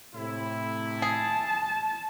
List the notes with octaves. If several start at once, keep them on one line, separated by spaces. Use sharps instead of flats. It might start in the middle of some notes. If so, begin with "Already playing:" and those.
A2 C3 E4
G#4 A5